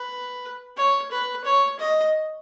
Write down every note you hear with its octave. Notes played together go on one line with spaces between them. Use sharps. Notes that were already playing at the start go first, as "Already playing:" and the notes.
Already playing: B4
C#5
B4
C#5
D#5